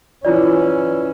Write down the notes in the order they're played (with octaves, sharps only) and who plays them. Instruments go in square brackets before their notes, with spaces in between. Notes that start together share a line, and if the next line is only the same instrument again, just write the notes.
[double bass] E3 C#4 [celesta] E4 F4 D5